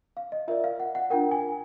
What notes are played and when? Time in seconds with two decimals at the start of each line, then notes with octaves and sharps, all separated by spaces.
0.17 F5
0.32 D#5
0.48 F4 A#4 D5 E5
0.64 F5
0.80 F#5
0.95 F#5
1.10 D4 F4 A#4 G5
1.31 G#5